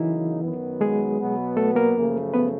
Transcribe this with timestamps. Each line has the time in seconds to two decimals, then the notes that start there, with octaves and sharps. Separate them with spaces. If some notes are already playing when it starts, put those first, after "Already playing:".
Already playing: C#3 E3 F#3 A#3 D#4 E4
0.42 F#2 D#3 F#3 B3
0.81 G#3 G#4
1.19 B2 F#3 B3
1.57 A3 A4
1.76 A#3 A#4
1.95 F#2 C#3 F3 A3
2.34 B3 B4